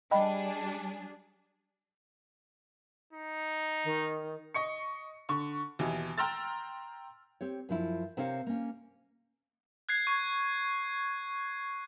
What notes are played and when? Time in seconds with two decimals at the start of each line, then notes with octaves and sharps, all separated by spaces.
0.11 G3 D4 G#4 D#5 G5 B5
3.13 D#4
3.85 D#3
4.54 D#5 C#6 C#7
5.29 D3 C#6
5.79 D#2 B2 E3
6.18 G5 A#5 C6 E6 F6 A6
7.41 C4 G4 C#5
7.69 F#2 F3 E4
8.17 C3 C4 A#4 C#5 F5
8.47 A#3 C#4
9.89 F#6 G#6 C7
10.07 C#6 G#6